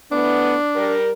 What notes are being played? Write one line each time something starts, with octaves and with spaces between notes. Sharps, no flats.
E3 A3 B3 D4
G3 A#4